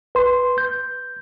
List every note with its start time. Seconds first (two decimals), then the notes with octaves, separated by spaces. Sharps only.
0.15 B4 C6
0.58 G6